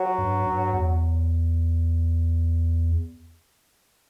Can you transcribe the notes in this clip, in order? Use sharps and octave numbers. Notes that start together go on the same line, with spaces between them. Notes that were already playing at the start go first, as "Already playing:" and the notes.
Already playing: F#3
G2
G2
E2